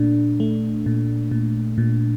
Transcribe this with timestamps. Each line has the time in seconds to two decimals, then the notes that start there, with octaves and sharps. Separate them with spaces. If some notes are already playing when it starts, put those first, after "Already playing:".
Already playing: A#2 A3 D4
0.40 A3
0.86 A#2
1.31 A#2
1.78 A#2